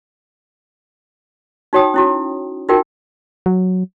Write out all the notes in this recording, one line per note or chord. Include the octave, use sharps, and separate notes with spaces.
D#4 F#4 C#5 G5 D#6
C#4 E4 F#4
D#4 F4 F#4 A#4 G5
F#3